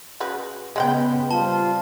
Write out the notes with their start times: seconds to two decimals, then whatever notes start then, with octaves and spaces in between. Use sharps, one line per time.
0.20 C#3 F#4 B4
0.76 C#3 G#3 B3 F#5 G5
1.31 G3 C4 F4 A5